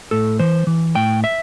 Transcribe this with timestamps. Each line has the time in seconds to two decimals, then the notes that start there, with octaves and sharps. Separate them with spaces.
0.11 A2 A4
0.39 E3 C5
0.67 E3
0.95 A2 G5
1.24 E5